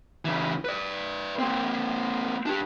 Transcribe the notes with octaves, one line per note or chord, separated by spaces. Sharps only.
C#3 E3
B4 D5
A#3 C4
D4 G4